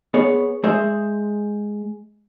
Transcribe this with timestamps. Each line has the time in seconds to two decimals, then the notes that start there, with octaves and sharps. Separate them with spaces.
0.14 B3 G#4 B4 C#5
0.64 G#3 G#4 C5 E5